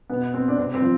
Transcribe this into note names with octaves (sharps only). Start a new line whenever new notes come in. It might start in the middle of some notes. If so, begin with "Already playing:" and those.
B2 B3
C4
D4
C3 C4
C4
F3